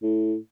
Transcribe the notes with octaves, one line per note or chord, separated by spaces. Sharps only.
A2